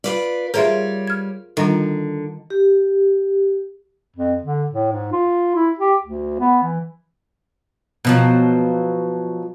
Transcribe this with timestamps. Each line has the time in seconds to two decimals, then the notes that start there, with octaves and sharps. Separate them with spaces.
0.04 F4 B4 D5
0.54 G3 F4 G#4 A#4 B4 C#5 D5 E5
1.07 F6 G#6
1.57 D3 D#3 G3 D4 F4
2.50 G4
4.16 F2
4.43 D3
4.70 A2
4.92 G#2
5.12 F4
5.56 E4
5.79 G4
6.03 D2
6.40 B3
6.63 E3
8.05 B2 F3 F#3